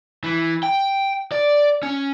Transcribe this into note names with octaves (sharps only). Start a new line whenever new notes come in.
E3
G5
D5
C#4